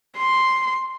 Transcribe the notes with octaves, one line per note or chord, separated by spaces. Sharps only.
C6